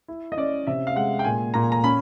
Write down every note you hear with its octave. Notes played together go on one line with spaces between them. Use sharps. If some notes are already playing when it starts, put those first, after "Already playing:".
E4
D#5
C#4 D5
C3 E5
F5
G#3 F#5
G5
A#2 G#5
A#2 A#5
A#5
C#4 B5